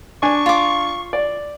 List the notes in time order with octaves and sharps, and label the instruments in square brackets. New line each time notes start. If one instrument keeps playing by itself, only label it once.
[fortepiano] D4 G#5 [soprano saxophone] C#6
[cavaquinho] F4 D6
[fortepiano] D5